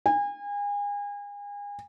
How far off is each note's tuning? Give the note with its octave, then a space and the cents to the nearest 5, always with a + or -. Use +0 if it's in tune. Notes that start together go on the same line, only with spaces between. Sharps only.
G#5 -35